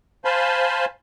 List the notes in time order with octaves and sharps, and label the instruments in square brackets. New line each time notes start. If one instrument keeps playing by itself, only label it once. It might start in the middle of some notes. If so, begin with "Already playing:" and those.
[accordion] C5 F5 G#5 A5 B5 C6